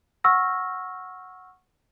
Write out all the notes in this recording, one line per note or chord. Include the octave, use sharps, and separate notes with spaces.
F#5 C#6 E6 F6 A#6